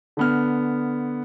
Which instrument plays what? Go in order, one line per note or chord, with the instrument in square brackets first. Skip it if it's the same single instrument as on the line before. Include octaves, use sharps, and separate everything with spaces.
[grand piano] D3 B3 F6